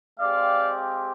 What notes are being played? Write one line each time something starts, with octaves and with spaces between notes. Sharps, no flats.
G#3 C4 G4 D5 F5